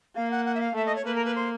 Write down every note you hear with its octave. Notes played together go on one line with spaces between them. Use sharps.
A#3 F5
F#5
F#5
E5
F5
A3 E5
D#5
C#5
A#3 B4
A#4
B4
C5